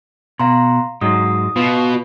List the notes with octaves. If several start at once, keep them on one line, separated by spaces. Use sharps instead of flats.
B2 F5 A#5 C6
G#2 F#3 G#3 D#6
B2 F4